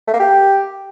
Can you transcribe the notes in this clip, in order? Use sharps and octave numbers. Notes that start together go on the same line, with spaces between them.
A3
A#3
G4